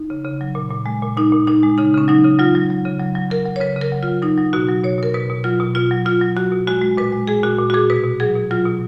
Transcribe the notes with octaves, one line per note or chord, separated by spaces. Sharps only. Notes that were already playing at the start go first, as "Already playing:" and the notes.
Already playing: D#4
C#3
C#3
F#3
A#2
A#2
G#3
A#2
A#2 D#4
A#2
A#2 D#4
G#3
C#3 D#4
C#3 C#4
F#3 D#4
C#3
F#3 F4
F#3
F#3
C#3
F#3
F#3
F#3 A#4
F#3
C#5
C#3 B4
C#3
A#4
F#3
F#3 F4
F#3 D#4
F#3
B2 F#4
F#3
B2 C#5
B2 A#4
B2 B4
B2
F#3 F4
B2
B2 F4
F#3
B2 F4
F#3
F#3 F#4
B2
G#3 F#4
G#3
A#2 B4
G#3
G#3 G#4
A#2 F#4
A#2
F#4
A#2 G#4
B2 B4
B2
F#3 G#4
B2
F#3 F4
B2